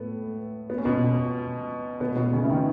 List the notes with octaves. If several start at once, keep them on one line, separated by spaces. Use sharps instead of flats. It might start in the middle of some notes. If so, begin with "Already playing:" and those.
Already playing: A2 A3 B3
B3
C#4
B2 B3
B2 B3
B2 B3
C#3 C#4
E4
D#3 D#4